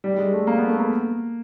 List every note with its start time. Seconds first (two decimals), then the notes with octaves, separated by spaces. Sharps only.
0.04 G3
0.14 G3
0.18 G#3
0.33 A3
0.47 A#3
0.58 B3
0.69 A3
0.80 A#3